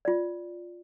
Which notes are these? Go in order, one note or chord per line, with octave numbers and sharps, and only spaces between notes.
F4 D5